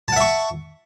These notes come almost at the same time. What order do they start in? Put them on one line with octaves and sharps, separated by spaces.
A5 F#5 E5 C#6